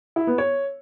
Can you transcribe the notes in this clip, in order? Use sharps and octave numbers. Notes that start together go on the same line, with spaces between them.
E4
B3
C#5